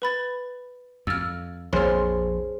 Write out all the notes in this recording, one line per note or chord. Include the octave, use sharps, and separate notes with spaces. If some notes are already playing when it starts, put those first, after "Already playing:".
B4 B5 A6
F2 E6 F6
A#1 F2 G#4 C5 C#5 C6 F6